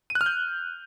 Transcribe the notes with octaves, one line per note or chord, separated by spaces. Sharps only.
D#7
F#6
F6
G6